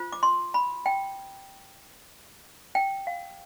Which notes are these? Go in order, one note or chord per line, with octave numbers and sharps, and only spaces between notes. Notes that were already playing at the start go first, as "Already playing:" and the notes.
Already playing: F4 C5
D6
C6
B5
G5
G5
F5